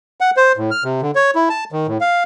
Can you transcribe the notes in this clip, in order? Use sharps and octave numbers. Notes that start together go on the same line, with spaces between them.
F#5
C5
A2
F6
C3
D3
C#5
E4
A5
D#3
A2
F5